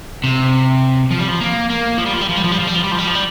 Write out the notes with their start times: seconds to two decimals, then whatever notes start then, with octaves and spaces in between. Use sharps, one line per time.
0.24 C3
1.11 F3
1.19 G3
1.29 F3
1.41 A#3
1.69 A#3
1.98 F3
2.06 G3
2.13 F3
2.21 G3
2.29 F3
2.36 G3
2.44 F3
2.52 G3
2.60 F3
2.67 G3
2.76 F3
2.84 G3
2.92 F3
2.99 G3
3.07 F3
3.15 G3